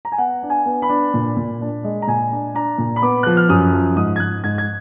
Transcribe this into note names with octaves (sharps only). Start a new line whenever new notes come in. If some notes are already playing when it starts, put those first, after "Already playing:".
A#5
G#5
B3 F#5
D4
G#5
B3
B5
D4
A#2
A#2
D4
G#3
A#5
A#2 G#5
D4
D4 A#5
A#2
B5
B3 D6
F3 F#6
F6
F#2 D#6
F3
G#2 D#6
G#6
G#2 F#6
G#2 G#6
G#6